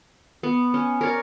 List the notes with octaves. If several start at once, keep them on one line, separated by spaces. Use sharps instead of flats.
B3
C#4
A#4 C#5 D5